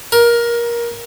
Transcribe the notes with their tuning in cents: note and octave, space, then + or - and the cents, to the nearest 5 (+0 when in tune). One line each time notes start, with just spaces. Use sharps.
A#4 +20